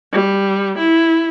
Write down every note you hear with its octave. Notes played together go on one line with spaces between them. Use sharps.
G3
E4